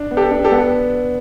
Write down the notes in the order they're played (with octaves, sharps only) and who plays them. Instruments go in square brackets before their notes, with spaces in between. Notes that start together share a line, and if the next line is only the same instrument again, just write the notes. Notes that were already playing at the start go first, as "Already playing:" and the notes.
Already playing: [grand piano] D4
B3
[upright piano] G4 A4
[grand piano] D4
[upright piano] G4 A4
[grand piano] B3